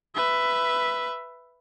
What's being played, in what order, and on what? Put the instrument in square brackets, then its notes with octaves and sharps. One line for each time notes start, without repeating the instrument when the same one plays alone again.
[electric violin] B4 E5